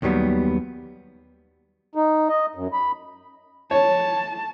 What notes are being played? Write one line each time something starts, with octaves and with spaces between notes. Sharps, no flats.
D#2 D#3 F#3 G3 B3
D#4
D#5
F#2
B5
C#5 A5